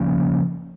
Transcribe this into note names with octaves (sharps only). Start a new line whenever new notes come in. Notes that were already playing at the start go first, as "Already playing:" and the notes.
Already playing: C#3 F3 A#3 C#4